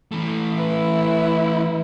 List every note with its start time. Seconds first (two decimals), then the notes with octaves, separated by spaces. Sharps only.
0.12 E3 A3
0.57 E4 B4